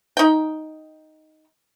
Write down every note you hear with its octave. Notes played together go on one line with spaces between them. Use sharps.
D#4 G5